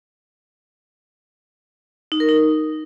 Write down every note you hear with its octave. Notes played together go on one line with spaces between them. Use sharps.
D#4
A#4
D#4